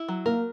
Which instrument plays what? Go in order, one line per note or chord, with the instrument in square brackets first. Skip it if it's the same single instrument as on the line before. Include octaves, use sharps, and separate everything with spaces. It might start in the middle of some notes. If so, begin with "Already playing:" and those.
Already playing: [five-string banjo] E4
F#3
[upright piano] A#3 [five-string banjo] A#4